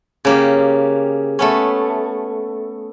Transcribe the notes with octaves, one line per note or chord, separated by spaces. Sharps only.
C#3 A#3 G4
A3 B3 C#4